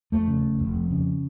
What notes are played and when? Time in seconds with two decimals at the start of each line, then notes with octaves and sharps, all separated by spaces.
0.12 F2 A3
0.28 C#3
0.44 F1
0.59 F1
0.74 F2
0.91 C#3